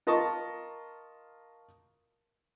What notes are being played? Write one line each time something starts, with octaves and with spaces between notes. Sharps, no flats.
F4 A#4 D#5 A5 C#6